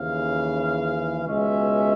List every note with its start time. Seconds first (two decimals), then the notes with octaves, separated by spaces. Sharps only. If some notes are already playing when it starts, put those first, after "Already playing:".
Already playing: D#2 C#3 E3 F5
1.25 C#2 B2 G#3 C#4 E5